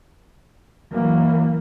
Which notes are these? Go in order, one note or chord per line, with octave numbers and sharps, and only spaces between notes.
E3 F#3 A#3